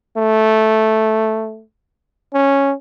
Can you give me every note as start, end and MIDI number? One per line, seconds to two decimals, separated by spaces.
0.17 1.63 57
2.34 2.74 61